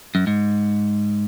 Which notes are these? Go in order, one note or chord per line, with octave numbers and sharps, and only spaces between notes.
F#2
G#2